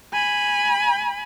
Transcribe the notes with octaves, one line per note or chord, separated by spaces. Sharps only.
G#5 B5